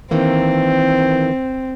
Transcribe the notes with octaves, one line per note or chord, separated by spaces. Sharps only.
D#3 E3 A#3 C4